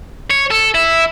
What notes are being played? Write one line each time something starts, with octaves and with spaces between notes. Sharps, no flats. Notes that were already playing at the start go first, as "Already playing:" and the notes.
C#5
A4
E4